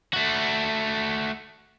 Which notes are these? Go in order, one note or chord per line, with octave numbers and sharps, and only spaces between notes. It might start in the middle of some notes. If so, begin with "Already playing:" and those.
A3 F#4